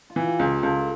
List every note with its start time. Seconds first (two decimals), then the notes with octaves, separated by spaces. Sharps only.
0.10 F4
0.16 E3
0.27 G4
0.39 C#2
0.45 G4
0.63 C#2 A4